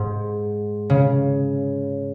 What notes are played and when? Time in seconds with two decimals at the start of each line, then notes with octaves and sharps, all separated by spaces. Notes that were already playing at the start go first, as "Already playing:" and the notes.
Already playing: G#2
0.90 C#3